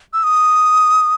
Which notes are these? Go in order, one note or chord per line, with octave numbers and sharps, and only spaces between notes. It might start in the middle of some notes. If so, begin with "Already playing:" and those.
E6
D#6